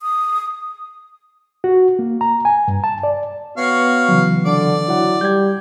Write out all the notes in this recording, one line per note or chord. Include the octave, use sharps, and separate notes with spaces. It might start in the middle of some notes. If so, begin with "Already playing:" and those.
D#6
F#4
A#3
A#5
G#5
G2
A5
D5
B3 F#4 C#5 F5
C#3 E3 F#3
D3 D5
F#3 E4 F#5
G3 G6 G#6